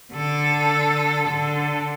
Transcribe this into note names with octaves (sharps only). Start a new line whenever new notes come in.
D3 A4
D3 A4